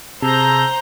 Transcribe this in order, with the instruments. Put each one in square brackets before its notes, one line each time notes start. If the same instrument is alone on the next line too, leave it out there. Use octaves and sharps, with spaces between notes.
[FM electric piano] C3 [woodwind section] G#4 A5 E6 [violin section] C5 A#5 G6